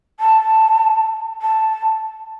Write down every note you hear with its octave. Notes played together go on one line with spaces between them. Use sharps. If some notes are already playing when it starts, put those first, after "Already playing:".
A5
A5